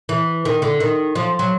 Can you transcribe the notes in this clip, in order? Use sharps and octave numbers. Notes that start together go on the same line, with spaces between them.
E3
D#3
D3
D#3
F3
F#3